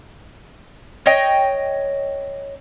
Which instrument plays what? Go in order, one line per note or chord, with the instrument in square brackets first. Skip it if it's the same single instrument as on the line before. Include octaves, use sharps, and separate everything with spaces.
[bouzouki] C#5 D#5 G5